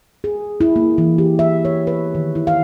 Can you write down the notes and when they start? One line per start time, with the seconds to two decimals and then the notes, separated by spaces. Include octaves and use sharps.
0.24 G#4
0.61 E4
0.76 A#3
0.98 E3
1.18 G4
1.39 E5
1.65 C#5
1.87 B4
2.15 D#3
2.35 E4
2.47 F5